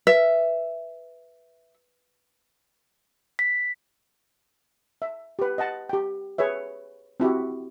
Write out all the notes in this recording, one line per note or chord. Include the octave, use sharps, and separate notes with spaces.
B4 E5
B6
E5
G4 B4
D#5 F#5 A5
G4 G5
G#4 B4 C#5 E5
C4 E4 F#4 G4